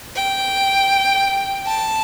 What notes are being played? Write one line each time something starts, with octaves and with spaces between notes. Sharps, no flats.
G5
A5